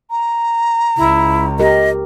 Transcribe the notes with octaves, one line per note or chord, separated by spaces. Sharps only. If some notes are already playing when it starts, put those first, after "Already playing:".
A#5
C#2 E4
G4 A#4 D#5